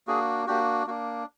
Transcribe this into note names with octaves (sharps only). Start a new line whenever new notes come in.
A#3 D4 F#4 G#4
A#3 D4 F#4 G4
A#3 D4 F#4